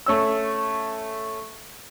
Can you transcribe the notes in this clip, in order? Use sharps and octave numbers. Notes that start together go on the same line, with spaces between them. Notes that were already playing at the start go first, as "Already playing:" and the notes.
A3 C#4 E6